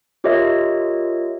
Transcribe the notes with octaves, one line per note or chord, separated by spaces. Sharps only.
F4 G4 A#4 C#5 D#5 E5